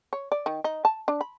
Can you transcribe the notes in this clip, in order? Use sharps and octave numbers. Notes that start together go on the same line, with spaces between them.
C#5
D5
D#3
D#4
A5
D4
B5